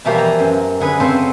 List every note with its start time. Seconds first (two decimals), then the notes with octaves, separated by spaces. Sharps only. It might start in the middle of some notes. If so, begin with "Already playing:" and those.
0.05 B2 E3 F3 G3 A#3 G4
0.18 A#5
0.39 F#2
0.80 D3 G#4 B4
1.00 C#3 B3 C4 A4 C5